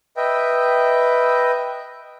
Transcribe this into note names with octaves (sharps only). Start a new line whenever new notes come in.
B4 D#5 E5 G5